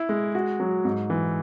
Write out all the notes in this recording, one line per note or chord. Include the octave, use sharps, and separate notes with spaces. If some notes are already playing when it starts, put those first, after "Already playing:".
Already playing: E4
G#3
F#4
F#3
G#2
E3